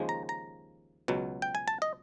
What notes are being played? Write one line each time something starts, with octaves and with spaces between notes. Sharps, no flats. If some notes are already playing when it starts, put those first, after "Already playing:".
Already playing: D#2 C#3 F3 G#3
A#5
A#5
C#2 B2 F#3
G5
G#5
A5
D#5